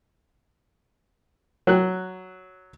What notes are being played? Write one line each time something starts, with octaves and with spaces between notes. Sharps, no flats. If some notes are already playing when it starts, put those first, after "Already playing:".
F#3 F#6